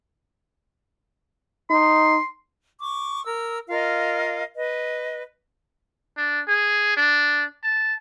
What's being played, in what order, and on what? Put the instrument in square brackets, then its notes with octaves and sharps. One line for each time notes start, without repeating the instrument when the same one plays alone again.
[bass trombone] D#4 [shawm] C6
[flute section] C#6 D6
A#4 E6
F4 A#4 D#5 F5
B4 D#5
[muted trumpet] D4
G#4
D4
A5